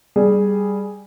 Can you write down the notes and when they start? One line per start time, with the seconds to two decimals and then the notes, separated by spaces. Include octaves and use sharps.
0.16 G3 G#4